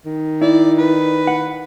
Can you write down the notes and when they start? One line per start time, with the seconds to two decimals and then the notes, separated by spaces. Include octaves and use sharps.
0.06 D#3
0.42 E4 D5
0.78 B4
1.27 F#5